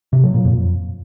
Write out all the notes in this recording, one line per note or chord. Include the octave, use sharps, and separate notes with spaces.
C3
F#3
A#2
F2